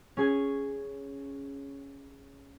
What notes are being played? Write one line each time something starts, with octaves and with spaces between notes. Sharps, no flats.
C#4 G#4 G#6